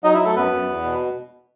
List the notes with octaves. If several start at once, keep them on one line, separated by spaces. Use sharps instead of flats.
F#3 D#4 D#5
E4 E5
F#3
A3 A4
F#2 B3 B4
F#2
E2
B2